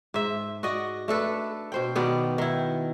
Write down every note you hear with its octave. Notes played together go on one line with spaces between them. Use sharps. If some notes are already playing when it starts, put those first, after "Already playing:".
G#2 E5
F#4 D5 D#5
A3 D4 A4 B4
B2 C5 G5
B2 D#3 B3 D5
D#3 E4